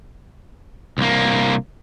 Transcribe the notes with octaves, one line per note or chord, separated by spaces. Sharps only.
C2 A#3